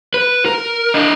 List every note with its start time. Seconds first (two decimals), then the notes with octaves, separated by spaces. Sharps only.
0.14 B4
0.46 A#4
0.94 D4 D#5